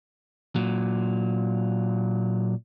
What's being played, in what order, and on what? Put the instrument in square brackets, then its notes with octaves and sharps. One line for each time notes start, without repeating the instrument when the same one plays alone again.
[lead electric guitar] A#2 F#3